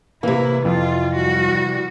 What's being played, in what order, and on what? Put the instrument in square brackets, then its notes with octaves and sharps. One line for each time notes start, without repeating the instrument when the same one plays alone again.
[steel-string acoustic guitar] C3 E3 [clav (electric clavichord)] A#3 [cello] E4
[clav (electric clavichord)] F2 [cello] F4
[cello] G3 F#4